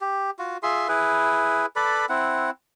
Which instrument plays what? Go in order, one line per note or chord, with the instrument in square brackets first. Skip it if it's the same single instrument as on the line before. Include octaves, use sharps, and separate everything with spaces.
[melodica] G4
F4 F#4
F4 G#4 E5 C6
E4 G#4 B4
A4 B4 D5 B5
C4 E4 F#5